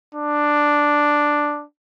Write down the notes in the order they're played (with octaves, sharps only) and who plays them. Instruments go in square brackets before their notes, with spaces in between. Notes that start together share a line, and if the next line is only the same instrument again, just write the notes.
[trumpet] D4